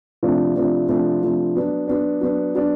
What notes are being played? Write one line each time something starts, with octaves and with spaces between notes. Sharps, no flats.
C3 F3 A3 D4
C3 F3 A3 D4
C3 F3 A3 D4
C3 F3 A3 D4
F#3 B3 D4
F#3 B3 D4
F#3 B3 D4
F#3 B3 D4